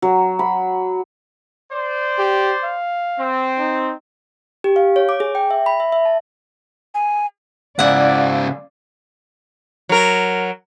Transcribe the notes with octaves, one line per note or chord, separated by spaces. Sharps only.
F#3
B5
C5 D5
G4
F5
C4
D#4
G4
F5
C#5
D6
G#4
G5
E5
B5
E5
E5
A5
G#5
G#2 C#3 E4 D5 F5 F#5
F#3 A#4